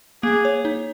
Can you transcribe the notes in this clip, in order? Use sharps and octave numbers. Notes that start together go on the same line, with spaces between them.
A#3 G#4
C#5
D#4